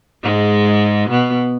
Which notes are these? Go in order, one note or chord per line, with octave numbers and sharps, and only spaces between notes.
G#2 G#3
B2 B3